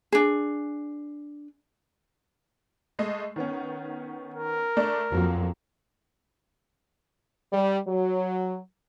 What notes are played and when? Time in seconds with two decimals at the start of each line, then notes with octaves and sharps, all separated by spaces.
0.12 D4 G#4
2.99 G#3 A3 D#5
3.36 D#3 B3 C#4
4.34 A#4
4.77 A3 D4 D5
5.12 F2 F3 F#3 A#3
7.52 G3
7.87 F#3